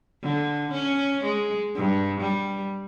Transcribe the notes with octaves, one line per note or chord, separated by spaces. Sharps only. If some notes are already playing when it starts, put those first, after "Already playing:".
D3
C#4
G#3
G2
G3